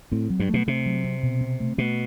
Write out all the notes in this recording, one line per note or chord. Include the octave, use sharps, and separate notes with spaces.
A2 C4
F#3
G2
B2 A3
C3 A3
F#3
C4
B2
C4
A3
B2 A3